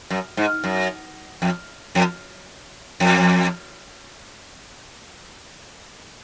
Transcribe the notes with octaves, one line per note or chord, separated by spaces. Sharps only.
F#2
G#2
F#2
F2
F2
F2